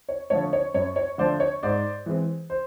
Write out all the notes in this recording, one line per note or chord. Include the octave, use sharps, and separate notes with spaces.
C#5
D3 F3 A3 C#5
C#5
F#2 C#5
C#5
D3 F3 A3 C5 D5
C#5
G#2 C5 D5
E3 G#3 C4
C5